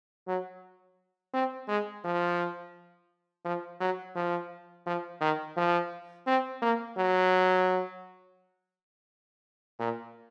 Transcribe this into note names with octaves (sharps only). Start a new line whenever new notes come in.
F#3
C4
G#3
F3
F3
F#3
F3
F3
D#3
F3
C4
A#3
F#3
A#2